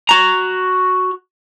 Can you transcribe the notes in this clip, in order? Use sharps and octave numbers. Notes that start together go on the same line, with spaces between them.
F#4 A#5